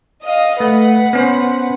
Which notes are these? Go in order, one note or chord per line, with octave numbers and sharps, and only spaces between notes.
D#5 F5
A3 B4 F#5
B3 C#4 C5